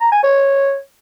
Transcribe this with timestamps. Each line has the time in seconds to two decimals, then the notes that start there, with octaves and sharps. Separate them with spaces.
0.01 A#5
0.12 G#5
0.23 C#5